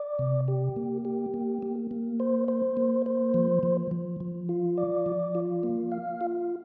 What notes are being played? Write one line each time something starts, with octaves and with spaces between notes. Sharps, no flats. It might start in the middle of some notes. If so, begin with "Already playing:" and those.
Already playing: D5
C3
G4
A#3
G4
A#3
A#3
A#3
C5
C5
A#3
C5
F3
F3
F3
F3
F4
D5
F3
F4
A#3
F5
F4